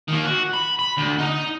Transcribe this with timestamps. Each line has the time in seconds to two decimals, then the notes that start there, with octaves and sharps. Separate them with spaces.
0.09 D#3 A#3
0.25 F#4
0.54 B5
0.79 B5
0.97 D2
1.18 D#4